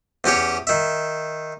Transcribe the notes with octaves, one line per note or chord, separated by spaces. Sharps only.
E2 C#4 G4 C#5
D#3 E5